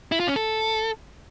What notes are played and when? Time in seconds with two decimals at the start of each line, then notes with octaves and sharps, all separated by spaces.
0.12 E4
0.20 F4
0.28 C#4
0.36 A4